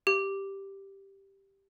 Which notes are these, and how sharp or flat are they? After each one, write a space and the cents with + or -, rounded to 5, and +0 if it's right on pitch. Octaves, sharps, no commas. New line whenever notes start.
G4 +0